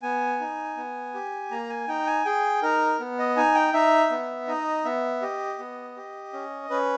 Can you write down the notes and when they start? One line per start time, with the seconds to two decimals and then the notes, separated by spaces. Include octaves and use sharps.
0.03 B3 G#5
0.40 D#4
0.77 B3
1.14 G4
1.51 A#3 A#5
1.70 G#5
1.88 D#4 G5
2.07 G#5
2.25 G#4 G5
2.62 D#4 A#4
3.00 B3
3.19 D#5
3.37 D#4 G#5
3.55 G5
3.74 D#4 E5
4.11 B3
4.48 D#4 D#5
4.85 B3 E5
5.22 G4 D#5
5.59 B3
5.96 G4
6.33 C#4
6.70 C#4 B4